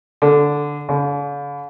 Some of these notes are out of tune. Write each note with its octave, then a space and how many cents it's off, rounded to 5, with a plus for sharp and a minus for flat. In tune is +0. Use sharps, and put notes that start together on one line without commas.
D3 -5
D3 -45